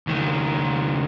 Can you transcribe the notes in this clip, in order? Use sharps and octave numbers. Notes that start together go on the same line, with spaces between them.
C#2 D#3